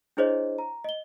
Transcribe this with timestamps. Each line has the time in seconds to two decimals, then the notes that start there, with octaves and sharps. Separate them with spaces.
0.17 D4 E4 G#4 C5 C#5 D#5
0.58 A#5
0.84 D#5 G7